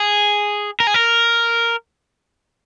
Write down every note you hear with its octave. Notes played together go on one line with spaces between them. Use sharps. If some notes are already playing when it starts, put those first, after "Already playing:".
Already playing: G#4
A#4
G#4
A#4